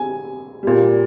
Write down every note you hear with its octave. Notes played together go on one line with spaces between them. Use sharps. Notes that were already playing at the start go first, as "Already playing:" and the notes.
Already playing: G#5
A#2 G3